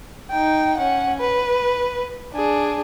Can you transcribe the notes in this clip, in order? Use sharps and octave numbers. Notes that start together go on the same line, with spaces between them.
D#4 G5
C#4 F#5
B4
D4 G#4